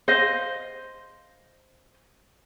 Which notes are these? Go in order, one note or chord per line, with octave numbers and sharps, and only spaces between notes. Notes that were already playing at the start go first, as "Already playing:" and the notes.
C5 D#5 F5